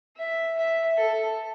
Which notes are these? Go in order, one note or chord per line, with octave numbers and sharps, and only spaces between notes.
E5
E5
A4